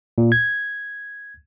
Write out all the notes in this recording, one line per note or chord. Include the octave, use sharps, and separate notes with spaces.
A#2
G#6